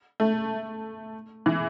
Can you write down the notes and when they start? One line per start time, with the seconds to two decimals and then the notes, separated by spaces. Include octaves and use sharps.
0.20 A3
1.46 E3